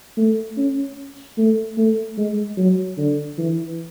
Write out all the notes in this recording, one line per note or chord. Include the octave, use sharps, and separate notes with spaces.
A3
C#4
A3
A3
G#3
F#3
D3
E3